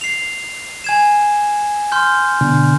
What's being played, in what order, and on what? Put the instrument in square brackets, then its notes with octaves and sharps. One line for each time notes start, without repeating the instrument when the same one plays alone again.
[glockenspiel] C7 F7
G#5 G#6 E7
C6 F6 G6
[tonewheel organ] B2 D3